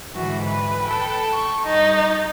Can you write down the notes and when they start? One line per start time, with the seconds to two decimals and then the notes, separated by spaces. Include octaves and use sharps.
0.16 G#2 D3 E3 F#4
0.45 B4
0.82 A4 G5
1.33 C#6
1.66 G2 D#4 A6